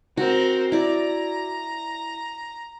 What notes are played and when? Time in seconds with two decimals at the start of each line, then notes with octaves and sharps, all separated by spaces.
0.17 C4 F#4 A#4
0.72 E4 D5 A#5